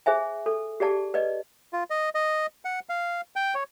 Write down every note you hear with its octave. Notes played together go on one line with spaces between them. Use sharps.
G#4 C5 E5 G#5
A4
G4 G#4 D5 A5
B4 D5 D#5
F4
D#5
D#5
F#5
F5
G5
C#5